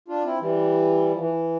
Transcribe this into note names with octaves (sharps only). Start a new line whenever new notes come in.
D4 F4
C4 E4
E3 G3
F3
E3